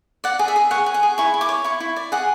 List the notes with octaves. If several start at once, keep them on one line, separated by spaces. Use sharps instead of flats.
D5 F#5
G#4
E5
G#4
C#5 F#5
G#4
F#5
G#4
E4 C#6
E4
D6
C#5
E4 C#6
E4
D5
G#4 F#5